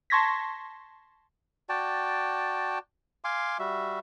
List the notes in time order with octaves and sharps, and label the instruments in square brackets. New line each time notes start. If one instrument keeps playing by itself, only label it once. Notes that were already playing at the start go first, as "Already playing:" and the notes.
[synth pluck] A5 C6 C#6 G#6 A#6 B6
[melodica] F#4 D5 G5 A5
F5 G#5 C6 D6
G3 F#4 E5